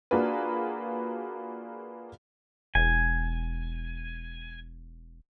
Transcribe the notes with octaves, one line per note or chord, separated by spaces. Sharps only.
A#3 D4 F4 F#4 G#4 B4
E1 G#5